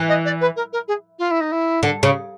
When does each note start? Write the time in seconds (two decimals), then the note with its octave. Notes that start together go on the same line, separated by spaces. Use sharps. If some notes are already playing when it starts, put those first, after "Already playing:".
Already playing: E3
0.08 D#5
0.25 D5
0.40 B4
0.56 A#4
0.72 A#4
0.87 G#4
1.18 F4
1.30 E4
1.40 D#4
1.51 E4
1.83 D3
2.03 C#3